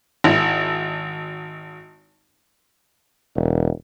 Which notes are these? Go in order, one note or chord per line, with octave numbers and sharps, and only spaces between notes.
G#1 E4
E1